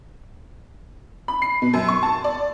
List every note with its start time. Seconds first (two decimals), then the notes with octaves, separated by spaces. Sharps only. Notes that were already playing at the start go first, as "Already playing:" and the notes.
1.28 B5
1.42 C7
1.62 B2
1.73 F#2
1.88 C#6
2.03 A5
2.24 D5